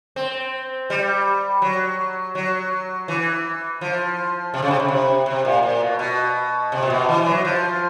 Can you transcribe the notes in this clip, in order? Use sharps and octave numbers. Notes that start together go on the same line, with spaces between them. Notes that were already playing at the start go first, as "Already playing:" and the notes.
C4
G3
F#3
F#3
E3
F3
C3
C#3
C3
C#3
C3
C3
A#2
A#2
B2
B2
C3
A#2
B2
E3
F#3
F3